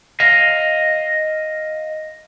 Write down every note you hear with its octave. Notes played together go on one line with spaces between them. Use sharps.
D#5 F5